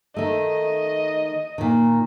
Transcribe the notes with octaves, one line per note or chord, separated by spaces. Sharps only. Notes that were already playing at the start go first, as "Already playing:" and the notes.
D#3 A3 D#5
A#2 D#3